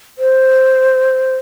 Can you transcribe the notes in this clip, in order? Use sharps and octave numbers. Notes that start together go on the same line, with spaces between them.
C5